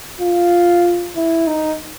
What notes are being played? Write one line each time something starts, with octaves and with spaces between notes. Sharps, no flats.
F4
E4
D#4